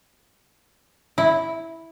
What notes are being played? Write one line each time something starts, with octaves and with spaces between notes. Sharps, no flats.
E4